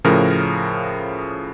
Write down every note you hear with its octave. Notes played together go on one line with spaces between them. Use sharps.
A2 C#3 F3 A#4